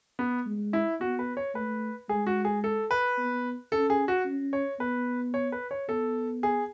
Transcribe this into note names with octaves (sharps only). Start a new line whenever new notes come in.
B3
G#3
E4
B3 F#4
B4
C#5
A3 B4
G#3 G#4
F#4
G#4
A4
B4
B3
C#4 A4
G#4
F#4
C#4
C#5
B3 B4
C#5
B4
C#5
B3 A4
G#4